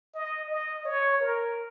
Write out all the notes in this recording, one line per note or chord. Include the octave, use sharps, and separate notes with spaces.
D#5
D#5
C#5
A#4